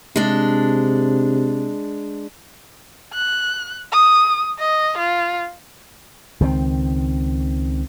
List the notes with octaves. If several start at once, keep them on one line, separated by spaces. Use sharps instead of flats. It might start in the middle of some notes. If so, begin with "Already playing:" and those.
C3 G#3 D4
F#6
D#6
D#5
F4
C#2 D#3 F#3 C4